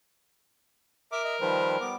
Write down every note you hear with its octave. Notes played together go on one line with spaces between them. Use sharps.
A#4 E5 D6
D#5 E5
D#3 F3 G3 B4 C5
G3 B3 D6